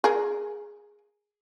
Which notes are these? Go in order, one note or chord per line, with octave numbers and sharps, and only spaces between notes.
G#4 A#4